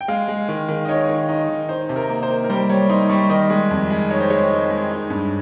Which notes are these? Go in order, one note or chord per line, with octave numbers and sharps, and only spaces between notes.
G5
G#3 F5
G#3
D#3
D#3
D#5
D#4 C#5
D#3
D#4
D#3
D#4 C5
C3
A#4
A#3
C5
A#3
A#4
G3 C5
G3 C#5
D#4 C6
G3 C#6
D#3 D#5
G#3
F2
G#3
D#4 C#5
C5
G#3 C#5
D#4
G#3
D#4
G2